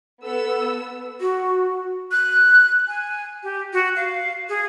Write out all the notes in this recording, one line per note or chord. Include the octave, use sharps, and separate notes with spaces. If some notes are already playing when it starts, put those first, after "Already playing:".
B3 A4 E6
F#4
F#6
G#5
G4
F#4
F5
G#4